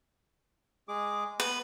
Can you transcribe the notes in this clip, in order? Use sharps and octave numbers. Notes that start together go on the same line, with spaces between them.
G#3 G#4 D6
B3 B4